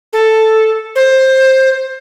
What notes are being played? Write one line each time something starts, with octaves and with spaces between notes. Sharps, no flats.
A4
C5